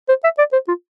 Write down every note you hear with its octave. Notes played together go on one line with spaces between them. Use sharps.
C5
E5
D5
C5
F4